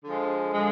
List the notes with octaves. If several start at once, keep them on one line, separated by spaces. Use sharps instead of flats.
D3 F3 G#3
D3 F3 G#3